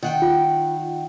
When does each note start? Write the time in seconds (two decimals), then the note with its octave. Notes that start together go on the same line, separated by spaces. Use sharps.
0.03 D#3 F#5 G5
0.22 F4